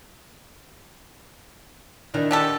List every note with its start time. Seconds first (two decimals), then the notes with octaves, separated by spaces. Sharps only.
2.14 D#3 D4 E4
2.31 D3 G4 A4